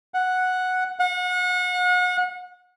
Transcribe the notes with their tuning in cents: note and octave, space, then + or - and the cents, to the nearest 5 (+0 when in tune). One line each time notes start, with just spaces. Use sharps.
F#5 -5
F#5 -35